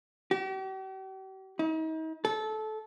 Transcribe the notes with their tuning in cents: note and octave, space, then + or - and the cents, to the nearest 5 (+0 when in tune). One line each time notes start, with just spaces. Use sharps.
G4 -45
D#4 +40
A4 -20